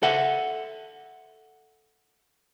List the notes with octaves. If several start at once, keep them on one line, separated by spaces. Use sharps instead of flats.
A4 E5 F#5